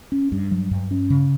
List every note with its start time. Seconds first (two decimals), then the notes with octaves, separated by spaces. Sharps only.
0.12 C#4
0.32 G2
0.51 F#3
0.71 G2
0.91 C#4
1.10 C#3